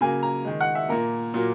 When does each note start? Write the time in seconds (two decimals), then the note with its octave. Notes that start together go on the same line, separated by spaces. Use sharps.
0.01 C#3 F#3 A#3 G#5
0.23 A#5
0.45 D#3 G#3
0.61 F#5
0.75 E5
0.89 A#2 A#3 A#4
1.34 A#2 F#3 A#3